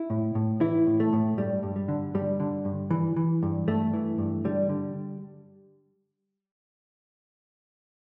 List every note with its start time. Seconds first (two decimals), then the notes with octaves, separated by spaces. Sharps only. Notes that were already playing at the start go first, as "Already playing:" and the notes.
Already playing: E4
0.10 A2
0.35 A2
0.61 E3 E4
0.87 A2
1.00 A3
1.13 A2
1.38 G2 G3
1.63 G2
1.76 G3
1.88 D3
2.14 G2 G3
2.40 D3
2.65 G2
2.91 E3
3.16 E3
3.43 G2
3.68 G2 A3
3.93 E3
4.18 G2
4.45 D3 G3
4.69 D3